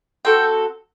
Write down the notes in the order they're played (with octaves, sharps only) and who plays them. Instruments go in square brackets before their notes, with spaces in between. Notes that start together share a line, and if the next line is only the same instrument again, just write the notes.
[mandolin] C4 F#4 A4 G5